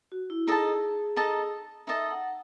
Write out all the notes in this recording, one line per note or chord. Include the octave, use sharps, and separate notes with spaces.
F#4
E4
D#4 G#4 A4 D#5 A5
D#4 A4 D#5 A5
D#4 A4 D#5 E5 A5
F#5